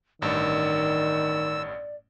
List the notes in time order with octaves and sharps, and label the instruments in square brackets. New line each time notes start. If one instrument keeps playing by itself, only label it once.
[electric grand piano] A1 G2 [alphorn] D#3 [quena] D5 [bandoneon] E6